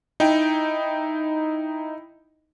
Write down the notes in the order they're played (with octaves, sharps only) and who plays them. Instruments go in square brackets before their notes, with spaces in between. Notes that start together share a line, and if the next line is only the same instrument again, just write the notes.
[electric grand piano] D#4 E4 G5